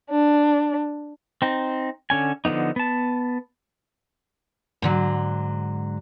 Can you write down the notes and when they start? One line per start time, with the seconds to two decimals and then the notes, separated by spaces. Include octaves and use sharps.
0.10 D4
1.42 C4 D#4
2.10 D3 C#4 G#5
2.45 D3 F3 A3 B3 D#4
2.76 B3 A5
4.82 G#2 D3 F#3